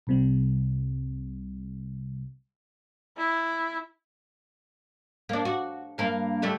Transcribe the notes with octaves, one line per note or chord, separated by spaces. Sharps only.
C2 C3 G3
E4
A#3 D4
F#4
G2 A#3 F5
D3 G3 A3